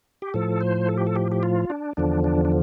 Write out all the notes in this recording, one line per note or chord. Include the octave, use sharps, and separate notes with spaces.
G4
A2 F3 A4
C5
A4
G4
A4
G4
G4
F4
D4
E2 D3 F3 D4
D4
D4